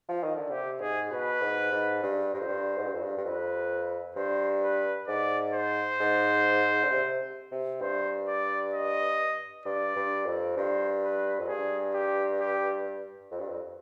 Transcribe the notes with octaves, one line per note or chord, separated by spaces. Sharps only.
F3
D#3
D3
C3 G4
G#2 G#4
B2 B4
G#2
G#2
G2
G2 C5
F2
G2
G#2
G2
F2
G2
G2
F2 B4
G2 C5
B4
G#2 D5
C5
G#2
D3
C3
C3
G2 C5
D5
D#5
G2 D5
G2
F2
G2 C5
B4
F2
G2 G#4
G4
G4
F2
G2
F2